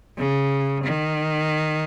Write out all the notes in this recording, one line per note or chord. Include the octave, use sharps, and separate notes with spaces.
C#3
D#3